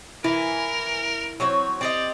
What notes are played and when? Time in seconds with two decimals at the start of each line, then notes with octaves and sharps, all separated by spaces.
0.24 E3 E4 A#4
1.40 F#3 C4 C#5
1.81 C4 G4 D5 D#5